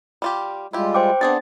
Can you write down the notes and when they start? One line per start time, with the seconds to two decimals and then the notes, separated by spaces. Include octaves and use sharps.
0.22 G3 F4 G4
0.73 G3 G#3 E4 F4 G4
0.94 C5 G5 D6
1.21 B3 C4 D4 G#4 D5 A6